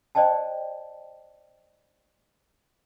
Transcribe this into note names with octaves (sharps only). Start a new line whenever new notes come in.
C5 D5 D#5 G5 A5